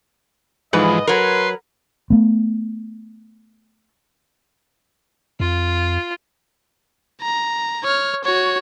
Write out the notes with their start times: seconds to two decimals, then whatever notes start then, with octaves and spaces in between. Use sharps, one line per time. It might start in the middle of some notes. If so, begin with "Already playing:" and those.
0.73 G#2 E3 F3 G#3 B4 D#5
1.07 F#3 A#4 B4 C6
2.10 A3 B3
5.40 F2 F4
7.22 A#5
7.84 C#5 F6
8.24 F#4 C#5